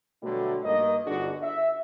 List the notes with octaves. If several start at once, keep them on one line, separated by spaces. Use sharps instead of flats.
B2 D3 F#3 G3 A3
G2 D#3 A#3 D#5
G1 D3 D4 D#4 F#4 G#4
E5